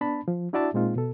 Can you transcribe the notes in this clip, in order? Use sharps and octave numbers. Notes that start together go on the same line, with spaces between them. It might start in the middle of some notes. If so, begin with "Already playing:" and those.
B3 D4 A5 B5
F3
D4 E4 F#4 D5 E5 A5
A#2 G#3 C4 D#4 F4
B2 A4